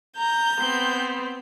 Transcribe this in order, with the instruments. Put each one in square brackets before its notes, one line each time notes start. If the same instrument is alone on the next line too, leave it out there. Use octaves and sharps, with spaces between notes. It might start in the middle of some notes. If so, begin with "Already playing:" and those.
[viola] A#5 [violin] G6
[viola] B3 C4